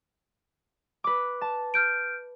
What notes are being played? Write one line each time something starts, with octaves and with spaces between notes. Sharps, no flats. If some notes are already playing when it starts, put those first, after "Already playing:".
B4 D6
A5
F6 G6 D7